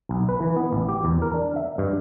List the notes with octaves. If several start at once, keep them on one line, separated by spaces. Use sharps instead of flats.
B1
B4
E3
B3
A1
G4
E2
A#4
D4
E5
G2